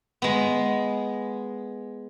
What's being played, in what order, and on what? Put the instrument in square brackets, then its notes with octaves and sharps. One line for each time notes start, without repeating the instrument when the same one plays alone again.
[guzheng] G#3 B3